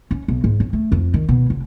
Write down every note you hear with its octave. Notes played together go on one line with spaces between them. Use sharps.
C#4
B1
G#2
C#4
A3
F2
D#3
B2
F1